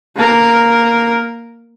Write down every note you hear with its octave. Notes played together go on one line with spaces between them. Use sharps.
A#3 A#4